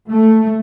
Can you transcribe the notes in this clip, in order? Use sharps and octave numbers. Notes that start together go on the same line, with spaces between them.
A3